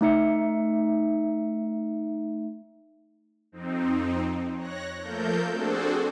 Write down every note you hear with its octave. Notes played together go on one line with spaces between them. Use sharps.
A3 D#4 E5 C#7
F2 C4 D#4
C#5 F#6 A#6
F3 A3 A#3 A4 A#4 G6
C4 D4 F#4 G#4 A4 C5